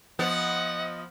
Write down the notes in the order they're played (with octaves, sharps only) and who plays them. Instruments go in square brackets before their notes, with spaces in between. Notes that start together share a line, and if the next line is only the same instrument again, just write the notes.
[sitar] F3 B3 [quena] D#5 [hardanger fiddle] F#5